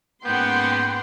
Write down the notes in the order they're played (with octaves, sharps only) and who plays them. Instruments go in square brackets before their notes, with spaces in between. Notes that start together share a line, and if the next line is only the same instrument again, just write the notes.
[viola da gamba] G#2 A#3 C#4 [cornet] B3 [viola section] F#5 G5 C6 [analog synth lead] G6